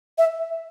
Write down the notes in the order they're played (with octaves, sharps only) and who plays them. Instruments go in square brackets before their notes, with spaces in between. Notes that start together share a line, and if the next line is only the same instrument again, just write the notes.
[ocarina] E5